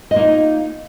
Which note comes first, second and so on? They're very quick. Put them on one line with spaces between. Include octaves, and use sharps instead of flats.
D#5 F4 A#3 D#4